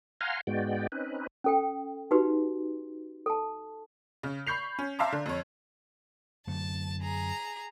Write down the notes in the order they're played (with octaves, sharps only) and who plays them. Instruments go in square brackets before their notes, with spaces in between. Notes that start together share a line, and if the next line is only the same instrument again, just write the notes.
[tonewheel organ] F5 F#5 G#5 A#5 C6 F6
G#2 G#3 B3 F#4 D5 G5
C4 C#4 D#4 B4
[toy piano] C#4 A4 G5
D#4 F#4 G4 B4 C6
A4 A5
[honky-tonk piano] C#3
B5 C#6 G6 C7 F7
C#4
E5 F5 A5 A#5 C6 D6
D3
F2 C#5
[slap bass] F#2 D3 A3 [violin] A5
[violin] G#4 A#5